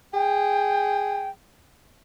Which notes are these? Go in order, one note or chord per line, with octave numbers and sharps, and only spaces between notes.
G#4 G5